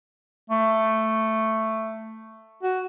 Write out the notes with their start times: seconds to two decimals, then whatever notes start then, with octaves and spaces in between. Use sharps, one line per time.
0.49 A3
2.63 F#4